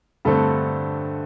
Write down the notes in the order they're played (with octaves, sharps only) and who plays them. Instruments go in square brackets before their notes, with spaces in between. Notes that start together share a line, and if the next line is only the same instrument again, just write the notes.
[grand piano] G2 D3 A3 C4 A4